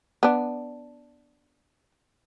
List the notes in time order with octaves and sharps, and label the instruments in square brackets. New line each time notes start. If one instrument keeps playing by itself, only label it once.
[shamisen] B3 D4